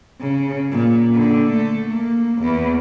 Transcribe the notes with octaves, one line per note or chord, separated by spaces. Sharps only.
C#3
A#2
D3
A3
A#3
E2